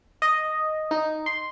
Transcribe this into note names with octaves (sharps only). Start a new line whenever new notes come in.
D#5
D#4
C6